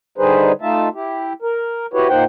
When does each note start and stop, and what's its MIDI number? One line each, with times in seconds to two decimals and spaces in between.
0.18 0.52 50
0.18 0.52 55
0.18 0.52 63
0.18 0.52 68
0.18 0.52 71
0.18 0.52 72
0.61 0.89 57
0.61 0.89 63
0.61 0.89 65
0.61 0.89 76
0.61 0.89 81
0.95 1.33 64
0.95 1.33 67
1.42 1.86 70
1.93 2.08 64
1.93 2.08 66
1.93 2.08 67
1.93 2.08 71
1.93 2.08 73
2.09 2.24 46
2.09 2.24 58
2.09 2.24 63
2.09 2.24 72
2.09 2.24 78
2.09 2.24 79